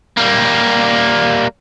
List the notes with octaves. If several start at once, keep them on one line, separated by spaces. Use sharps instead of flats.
G3 A#3